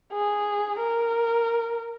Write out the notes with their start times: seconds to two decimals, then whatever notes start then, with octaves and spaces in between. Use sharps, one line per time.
0.12 G#4
0.79 A#4